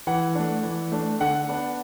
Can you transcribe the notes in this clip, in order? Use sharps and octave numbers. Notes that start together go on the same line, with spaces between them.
E3 F#5
A3 D4
E3
A3 D4
D3 F#5
B3 D4